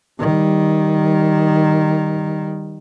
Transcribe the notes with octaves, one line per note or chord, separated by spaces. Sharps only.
D#3 G3